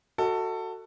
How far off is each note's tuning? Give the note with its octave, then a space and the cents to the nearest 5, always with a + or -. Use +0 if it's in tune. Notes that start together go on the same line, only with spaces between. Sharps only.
F#4 +0 A4 +20 D#5 +40